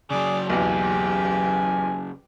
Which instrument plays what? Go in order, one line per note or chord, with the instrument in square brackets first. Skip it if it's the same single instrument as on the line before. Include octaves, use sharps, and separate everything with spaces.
[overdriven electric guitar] C#3 F#3 [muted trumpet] G#4 [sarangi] D5
[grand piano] B1 E2 [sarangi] G4 [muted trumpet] G#5